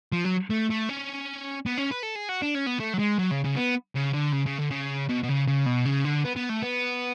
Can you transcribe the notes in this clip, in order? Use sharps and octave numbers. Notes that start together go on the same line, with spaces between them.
F3
F#3
A3
A3
C#4
B3
C#4
B4
A4
G#4
F#4
D4
C#4
B3
A3
F#3
G#3
F#3
C#3
C#3
B3
C#3
D3
C#3
C#3
D3
C#3
B2
B2
C#3
C#3
B2
C#3
D3
B3
B3
A3
B3